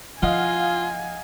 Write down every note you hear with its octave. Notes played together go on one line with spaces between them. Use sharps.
F3 E4 F4 D#5 F5 F#5 G#5